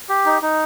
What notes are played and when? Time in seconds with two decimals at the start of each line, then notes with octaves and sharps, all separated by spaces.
0.09 G4
0.26 D#4
0.42 D#4